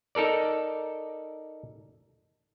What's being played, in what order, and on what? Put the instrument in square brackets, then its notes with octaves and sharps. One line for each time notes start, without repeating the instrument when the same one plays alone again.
[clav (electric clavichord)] D#4 A4 A#4 D5